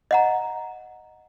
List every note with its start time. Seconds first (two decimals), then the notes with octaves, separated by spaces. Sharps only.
0.11 D#5 F#5 A#5